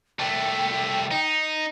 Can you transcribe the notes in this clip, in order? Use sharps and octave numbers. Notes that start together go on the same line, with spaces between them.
C2 A3 G5
D#4